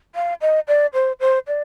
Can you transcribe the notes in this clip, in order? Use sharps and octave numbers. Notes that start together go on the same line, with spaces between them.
F5
D#5
D5
C5
C5
D5